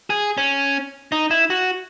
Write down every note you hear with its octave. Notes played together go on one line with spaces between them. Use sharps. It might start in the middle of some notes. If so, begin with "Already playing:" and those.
G#4
C#4
D#4
E4
F#4